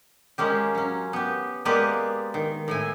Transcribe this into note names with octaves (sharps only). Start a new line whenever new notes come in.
G#3 A#3 C#4 G4
F#3 C#4
B3 G4
G#3 A#3 B3 G4 B4 D5
D#3
A2 E4 G#5